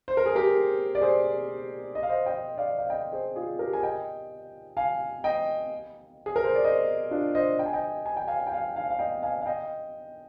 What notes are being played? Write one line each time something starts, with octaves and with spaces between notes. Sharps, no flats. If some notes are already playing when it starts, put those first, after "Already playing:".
C5
A#4
G#4
G4 A#4
D5
G#4 C5
D#5
F5
C5 D#5
D#5 G5
D5 F5
F5
D#5 G5
G#4 C5
F4 G#4
G4 A#4
G#5
D#5 G5
F5 G#5
D#5 G5
G#4
A#4
C5
D5
C5 D#5
D4 F4
C5 D#5
G5
G#5
D#5 G5
G#5
G5
F5 G#5
G5
F5 G#5
F5 G#5
F5
D#5 G5
F5 G#5
F5
D#5 G5